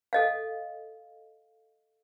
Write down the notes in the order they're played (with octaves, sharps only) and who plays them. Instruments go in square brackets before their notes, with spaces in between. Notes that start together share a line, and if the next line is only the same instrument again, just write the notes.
[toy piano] A4 D#5 F5